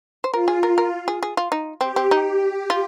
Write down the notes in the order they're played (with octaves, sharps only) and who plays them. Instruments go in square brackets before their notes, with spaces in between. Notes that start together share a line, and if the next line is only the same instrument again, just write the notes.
[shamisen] C5
[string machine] F4 [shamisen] A#4
[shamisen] G#4
A#4
A#4
G#4
G#4
F4
D#4
[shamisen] C4 [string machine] G4
[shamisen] C4
D#4
F4